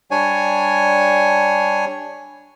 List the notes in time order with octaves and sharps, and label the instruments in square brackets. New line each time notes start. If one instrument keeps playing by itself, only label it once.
[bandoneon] G3 D4 C#5 G#5